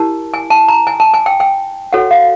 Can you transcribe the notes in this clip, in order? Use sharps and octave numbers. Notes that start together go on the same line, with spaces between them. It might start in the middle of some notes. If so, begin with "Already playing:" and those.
Already playing: E4 G4 A#4 A5
G#5
A5
A#5
G#5
A5
G#5
G5
G5
F#4 A4 C#5 F#5
F5